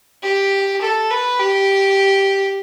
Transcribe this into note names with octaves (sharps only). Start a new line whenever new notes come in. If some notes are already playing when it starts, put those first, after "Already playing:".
G4
A4
B4
G4